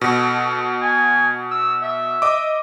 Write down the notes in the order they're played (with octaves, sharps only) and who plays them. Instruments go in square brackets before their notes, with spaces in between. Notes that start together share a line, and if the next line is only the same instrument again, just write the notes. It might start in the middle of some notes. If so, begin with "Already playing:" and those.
[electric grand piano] B2 [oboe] A4
[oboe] G#5
E6
E5
[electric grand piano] D#5 D6